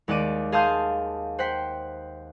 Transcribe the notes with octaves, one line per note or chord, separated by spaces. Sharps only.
D#2 G#3 D5 F#5 D6 D#7
G#4 F5 A5 C6 D#6 G6
C5 F#5 G5 B6